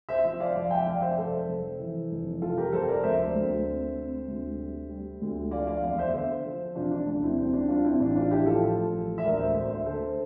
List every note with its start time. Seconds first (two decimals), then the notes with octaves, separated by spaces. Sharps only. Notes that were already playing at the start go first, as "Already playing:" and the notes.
0.09 C5 E5
0.24 F3
0.40 D5 F5
0.55 F1 D5 F5
0.71 E5 G5
0.86 F1 D5 F5
1.02 C5 E5
1.17 F1 A4 C5
1.49 F1
1.79 E3
2.11 F1
2.41 F1 F4 A4
2.58 G4 A#4
2.72 F1 A4 C5
2.88 A#4 D5
3.03 D2 C5 E5
3.35 D2
3.66 C3
3.96 C3
4.28 D2
4.59 G3
4.90 G3
5.22 D2
5.51 F3 D5 F5
5.67 D5 F5
5.83 E2 D5 F5
5.98 C5 E5
6.13 D3 C5 E5
6.45 F3
6.75 E1 D4 F4
6.91 D4
7.07 D2 D4
7.22 C4 E4
7.38 G3 C4
7.53 D4
7.68 G3 D4 F4
7.84 C4 E4
8.00 A1 D4
8.16 D4 F4
8.31 F3 E4 G4
8.46 F4 A4
8.62 A2
8.93 A1
9.18 E5
9.24 D2 A#4 D5
9.39 C5 E5
9.55 D2 C5 E5
9.70 C5 E5
9.86 D3 A4 C5